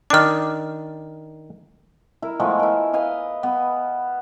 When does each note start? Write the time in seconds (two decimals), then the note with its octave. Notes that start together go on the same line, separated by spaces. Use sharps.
0.10 D#3 D4 D6 F6
2.22 E4 A#4
2.40 F3 G#3 A3 B3
2.59 E4 A#4
2.93 B4 D#5 F5 G#5
3.43 B3